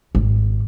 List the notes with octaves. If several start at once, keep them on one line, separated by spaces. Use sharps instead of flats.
G#1